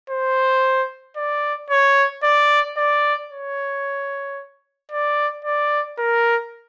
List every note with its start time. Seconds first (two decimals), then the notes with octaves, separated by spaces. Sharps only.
0.10 C5
1.17 D5
1.70 C#5
2.23 D5
2.77 D5
3.31 C#5
4.91 D5
5.45 D5
5.98 A#4